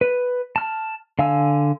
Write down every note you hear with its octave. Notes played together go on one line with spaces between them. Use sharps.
B4
A5 F6
D3 F5 G#5 E6